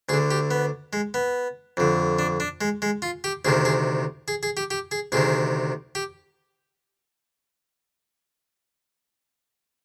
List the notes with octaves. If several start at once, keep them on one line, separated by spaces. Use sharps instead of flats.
D2 D3 G#4
G4
B3
G#3
B3
F2 D3
D4
D4
G#3
G#3
F4
G4
D2 C3 D#3 G#4
G#4
G#4
G#4
G4
G4
G#4
D2 C3 D#3 G#4
G4